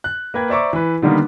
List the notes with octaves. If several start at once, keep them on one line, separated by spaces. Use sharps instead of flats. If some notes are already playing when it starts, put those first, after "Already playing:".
F#6
A#3 A#4 B4 G5 G#6
C5 D5 E5 A#5 C#6 D6
E3 B4
D3 D#3 G3 A#3 B3